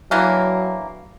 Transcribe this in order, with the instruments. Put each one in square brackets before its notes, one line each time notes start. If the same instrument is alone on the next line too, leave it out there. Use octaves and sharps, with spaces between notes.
[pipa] D3 E3 A#3 [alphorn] F#3